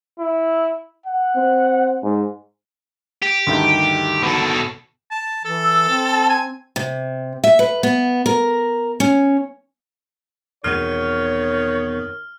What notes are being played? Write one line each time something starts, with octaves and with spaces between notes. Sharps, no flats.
E4
F#5
C4
G#2
G4
D2 G2 D#3
B2 A4
A5
E3 A4
E6
C4
A5
G#5
C3
E5
B4
B3
A#4
C#4
E2 B2 D#3 C4 C#5 F6